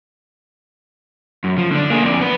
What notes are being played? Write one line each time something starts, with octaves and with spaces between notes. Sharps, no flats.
F#2
F3
D3 D4
A#3 G#4
F2 D5
B3 B4